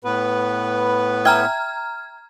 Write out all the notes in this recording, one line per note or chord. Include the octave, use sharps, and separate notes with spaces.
A2 B3 B4
E5 G5 G#5 A#5 F6 G#6